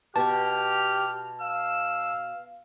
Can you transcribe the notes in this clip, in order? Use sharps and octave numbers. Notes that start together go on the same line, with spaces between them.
B2 G4 B4 A5 C#6 F6
F5 E6